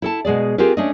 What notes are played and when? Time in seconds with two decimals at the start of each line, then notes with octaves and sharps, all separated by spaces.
0.02 E4 A4 A5
0.25 B2 G#3 G#4 D5
0.58 C4 F4 G4 G#4 A#4 B4
0.77 A3 C#4 D4 D5 D#5